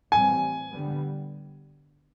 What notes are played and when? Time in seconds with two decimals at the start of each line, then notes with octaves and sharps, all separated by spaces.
0.12 A2 E3 G3 C4 G#5
0.72 D3 G3 B3